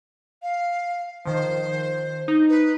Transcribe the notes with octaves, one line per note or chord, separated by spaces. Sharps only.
F5
D#3 F3 C5
D#4
B4